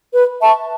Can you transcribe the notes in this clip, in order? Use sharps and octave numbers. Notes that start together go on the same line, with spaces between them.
B4
E5 A5 C#6